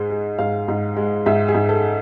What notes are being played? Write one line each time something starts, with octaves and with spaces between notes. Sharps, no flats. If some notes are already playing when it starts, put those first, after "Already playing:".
Already playing: G#2 G#3
G#3
G#2 F5
G#2
G#3
G#2 E5
G#4
G#2
A4